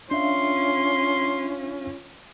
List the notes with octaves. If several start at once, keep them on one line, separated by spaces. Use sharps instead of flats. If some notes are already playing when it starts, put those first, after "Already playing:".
C#4 D4 F4 E5 F5 C6